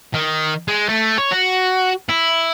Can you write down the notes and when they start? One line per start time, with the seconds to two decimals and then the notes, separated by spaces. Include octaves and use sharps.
0.14 D#3
0.68 G#3
0.89 A3
1.18 C#5
1.31 F#4
2.09 E4